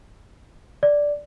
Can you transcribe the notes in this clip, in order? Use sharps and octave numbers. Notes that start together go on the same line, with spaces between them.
D5